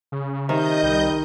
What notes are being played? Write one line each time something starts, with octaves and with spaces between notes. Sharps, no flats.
C#3
C3 D#3 D#5 G6
C2 G3